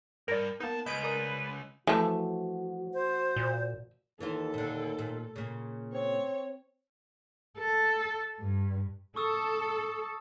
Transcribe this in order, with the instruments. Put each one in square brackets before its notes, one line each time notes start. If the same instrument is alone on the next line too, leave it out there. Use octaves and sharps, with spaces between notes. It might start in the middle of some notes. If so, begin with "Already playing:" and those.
[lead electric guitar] G2 [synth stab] A#4 D5
[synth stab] A#3 B3 [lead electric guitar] D#4 A5
[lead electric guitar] C#2 [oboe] B4 [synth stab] D#5 G6 D7
[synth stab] A#4 D5 D#6
[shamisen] E3 A3 [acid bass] F3 [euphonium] F#4
[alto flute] C5
[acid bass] A#2
[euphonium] D#2 [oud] E3 E4 F4 [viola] A4
[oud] A#2 D3
A#2
A#2 C#3
[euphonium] C4 [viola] C#5
[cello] A4
G2
[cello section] A4 [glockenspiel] C#6 D#6 E6